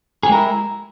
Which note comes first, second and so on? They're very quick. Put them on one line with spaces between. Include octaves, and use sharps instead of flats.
G#4 G4 G#3 A#4 E4